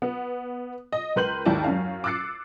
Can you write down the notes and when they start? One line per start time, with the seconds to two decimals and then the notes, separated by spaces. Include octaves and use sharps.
0.02 B3
0.92 D#5
1.16 C#2 A#4 B4 C6 G6 F#7
1.46 D#2 G#2 E4 D5 A5
1.64 F#2 C#4 F5
2.04 D6 E6 F#6 A6 C7 C#7